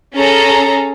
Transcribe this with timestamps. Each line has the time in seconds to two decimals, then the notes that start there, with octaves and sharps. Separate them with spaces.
0.14 C#4 G#4 A4 A#5